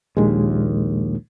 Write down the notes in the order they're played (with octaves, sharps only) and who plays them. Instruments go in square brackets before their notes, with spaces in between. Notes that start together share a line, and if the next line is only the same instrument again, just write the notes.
[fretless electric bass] A#1 D#2 [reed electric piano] A#2 G#3